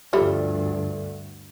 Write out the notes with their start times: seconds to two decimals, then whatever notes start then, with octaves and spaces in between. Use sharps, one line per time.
0.13 D2 G2 F3 G3 A4 D5 E5